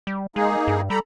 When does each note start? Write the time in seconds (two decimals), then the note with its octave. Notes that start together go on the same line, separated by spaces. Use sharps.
0.07 G3
0.36 G#3 A#3 D#4 G#4
0.67 G2
0.90 G3 A4 A#5 B5